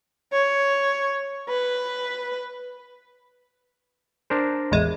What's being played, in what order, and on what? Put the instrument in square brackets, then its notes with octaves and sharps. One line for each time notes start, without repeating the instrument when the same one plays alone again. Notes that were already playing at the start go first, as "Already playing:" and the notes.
[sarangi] C#5
B4
[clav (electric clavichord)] D4 A#4 C5
[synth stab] A1 E2 G#3